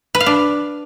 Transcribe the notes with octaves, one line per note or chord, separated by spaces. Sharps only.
B4
F5
D4